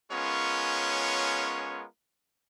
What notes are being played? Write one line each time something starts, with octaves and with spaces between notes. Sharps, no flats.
G#3 B3 C#4 F4 A#4 C#5